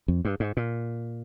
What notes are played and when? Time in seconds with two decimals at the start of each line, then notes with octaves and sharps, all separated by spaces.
0.08 F2
0.25 G2
0.40 G#2
0.57 A#2